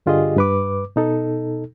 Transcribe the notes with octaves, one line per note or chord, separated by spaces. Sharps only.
G2 D3 F4 G4 G#4 D#5
G2 B4 D6
B2 D#4 A4